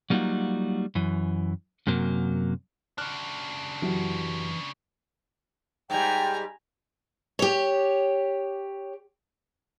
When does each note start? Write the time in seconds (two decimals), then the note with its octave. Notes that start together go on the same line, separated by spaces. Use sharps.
0.10 F#3 G3 A#3 D#4 F4 F#4
0.95 F#2 E3
1.87 F#2 C3 F#3 A#3
2.98 C#3 D4 F6 F#6
3.82 F#2 E3 E4 F#4 G4
5.90 G#2 G3 G5 G#5 A#5
7.39 G4 C#5